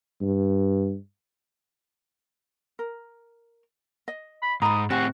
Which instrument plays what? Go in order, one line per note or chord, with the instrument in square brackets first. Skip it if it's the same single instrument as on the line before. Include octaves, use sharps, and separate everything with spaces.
[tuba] G2
[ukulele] A#4
D#5
[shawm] B5
[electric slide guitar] G#2 [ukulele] A#5 B5 [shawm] D#6
[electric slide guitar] A2 C4 [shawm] F#4 [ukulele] G4 F#5 G#5